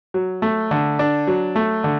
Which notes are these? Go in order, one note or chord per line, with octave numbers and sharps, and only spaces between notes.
F#3
A3
D3
D4
F#3
A3
D3